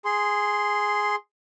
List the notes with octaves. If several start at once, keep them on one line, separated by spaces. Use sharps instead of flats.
G#4 C6